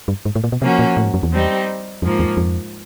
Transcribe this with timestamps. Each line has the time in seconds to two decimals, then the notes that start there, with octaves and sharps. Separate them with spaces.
0.08 G2
0.25 G#2
0.35 A2
0.44 A#2
0.52 B2
0.61 C3 F3 A#3 C#4 F#4
0.79 A#2
0.97 A2
1.05 G#2
1.14 F#2
1.23 E2
1.32 G3 C4 D#4 G4
2.02 F2 G#2 F3 A#3
2.19 E2
2.37 F2